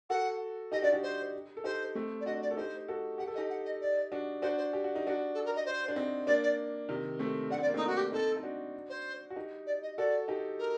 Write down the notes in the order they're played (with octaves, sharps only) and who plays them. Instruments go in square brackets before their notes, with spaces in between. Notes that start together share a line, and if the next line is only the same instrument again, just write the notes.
[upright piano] F#4 A4 [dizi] F#5
[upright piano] D#4 G4 [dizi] D#5
[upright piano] D4 F#4 [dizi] D5
[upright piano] D#4 G4
[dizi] C5
[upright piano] A4
[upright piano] D#4 G4 [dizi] C5
[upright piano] A3 C4
[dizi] D5
[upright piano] D4 F#4 [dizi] D#5
[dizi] D5
[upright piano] A4
[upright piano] D#4 G4 [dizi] C5
[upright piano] F#4 A4
[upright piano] G4 [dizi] F#5
[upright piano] A4
[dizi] D#5
[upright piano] D#4 G4
[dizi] F#5
D#5
D5
[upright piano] D4 F#4
[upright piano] D4 F#4 [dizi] C5
[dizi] C5
[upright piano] G4
F#4
D#4
D4 F#4
[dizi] A4
A#4
D#5
C5
[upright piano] D4
C4 D#4
[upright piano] A#3 D4 [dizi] D5
[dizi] D5
[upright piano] C3 D#3
A3 C4
[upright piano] D4 [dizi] F#5
[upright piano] C4
[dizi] D5
[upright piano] A#3
[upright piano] A3 C4 [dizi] D#4
[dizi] F#4
G4
[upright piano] C4 D#4 [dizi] A4
[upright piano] D#4
D4 F#4
[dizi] C5
[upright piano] F#4
D#4 G4
[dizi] D5
D#5
[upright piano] F#4 A4 [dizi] D5
[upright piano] D#4 G4
[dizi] A#4